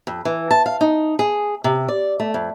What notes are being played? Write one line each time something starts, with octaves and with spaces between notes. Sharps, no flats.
F2
E3
A5
F5
D#4
G#4
C3
D5
A3
F2